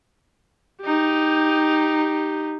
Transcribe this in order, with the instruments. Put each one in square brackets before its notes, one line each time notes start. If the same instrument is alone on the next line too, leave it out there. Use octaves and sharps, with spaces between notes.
[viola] D#4 G4